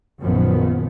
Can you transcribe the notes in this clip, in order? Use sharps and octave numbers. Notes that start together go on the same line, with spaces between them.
A#1 F#2 A#2 D#3 F3 B3